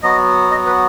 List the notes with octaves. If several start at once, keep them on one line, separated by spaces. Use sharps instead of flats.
F#3 B3 F#4 D#5
D#5
B4